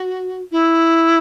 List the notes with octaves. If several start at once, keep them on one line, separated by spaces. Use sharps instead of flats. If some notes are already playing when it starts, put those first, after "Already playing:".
Already playing: F#4
E4